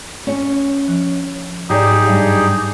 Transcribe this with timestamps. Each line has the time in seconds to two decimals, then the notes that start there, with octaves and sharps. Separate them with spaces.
0.27 C#4 G#5
0.88 F3
1.70 G#2 F#3 D#4 G4 G#4 D5
2.08 G2 F#3